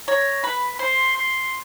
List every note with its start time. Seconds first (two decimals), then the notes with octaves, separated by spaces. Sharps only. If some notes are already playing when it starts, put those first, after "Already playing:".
0.08 C#5 A#5
0.44 B4 B5
0.79 C5 C6
1.15 C6